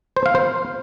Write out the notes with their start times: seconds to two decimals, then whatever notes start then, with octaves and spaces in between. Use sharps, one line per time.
0.17 C5
0.26 F5
0.35 C5